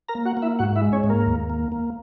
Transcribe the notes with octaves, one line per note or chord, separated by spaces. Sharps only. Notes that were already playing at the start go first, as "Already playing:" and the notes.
A#4 A#5
A#3
F#4 F#5
A#3
E4 E5
G#2 F#4 F#5
E4 E5
G#3
C#4 C#5
G#2
A#3 A#4
D#2
A#3
A#3